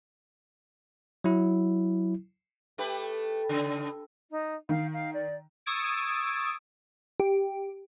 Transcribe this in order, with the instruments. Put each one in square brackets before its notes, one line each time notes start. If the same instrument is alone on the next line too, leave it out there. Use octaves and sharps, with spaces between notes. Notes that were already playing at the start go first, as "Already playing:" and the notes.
[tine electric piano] F#3 E4
[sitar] A3 G4 B4
C#3
[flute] D#4
[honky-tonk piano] D#3 [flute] F5
[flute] F5
D5
[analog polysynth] C#6 D#6 E6 G#6 A6 D7
[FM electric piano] G4